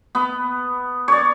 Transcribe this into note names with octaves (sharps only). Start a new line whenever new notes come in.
B3
C#5 D5